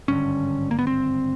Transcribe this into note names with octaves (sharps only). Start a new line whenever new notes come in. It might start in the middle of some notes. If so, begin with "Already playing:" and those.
G#1 G2 D3 C#4
A#3
B3
C4